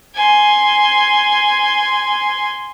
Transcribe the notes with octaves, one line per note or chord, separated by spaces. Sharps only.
G#5 C6